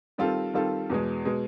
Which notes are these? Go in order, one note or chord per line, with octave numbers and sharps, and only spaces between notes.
D#3 G3 C4 F4 A4
D#3 G3 C4 F4 A4
E2 B2 G#3
B2 G#3